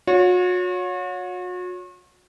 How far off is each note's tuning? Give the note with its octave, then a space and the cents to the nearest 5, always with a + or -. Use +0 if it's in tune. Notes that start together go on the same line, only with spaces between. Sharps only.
F#4 -40 C#5 +15